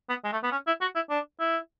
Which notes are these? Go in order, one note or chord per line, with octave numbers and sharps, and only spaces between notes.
B3
G#3
A3
B3
C#4
E4
F#4
E4
D4
E4